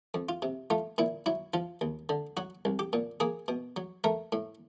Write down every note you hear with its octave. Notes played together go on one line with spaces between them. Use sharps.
F2
F4
C3
A3 F4
A#2 E4
F#3 E4
F3 F4
D#2
D3
F#3 F#4
C2
G4
A#2
A#3 G#4
B2
F#3
A3 A#4
A2